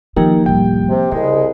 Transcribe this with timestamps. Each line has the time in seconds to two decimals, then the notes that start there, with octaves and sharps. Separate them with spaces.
0.16 D#3 F3 A#3 D#4 G4 A#4 G5
0.46 D1 C2 G5
0.90 C3
1.12 C2 C#3 G#3